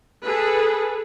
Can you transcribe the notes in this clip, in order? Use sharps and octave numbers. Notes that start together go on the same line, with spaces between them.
G#4 A4 B4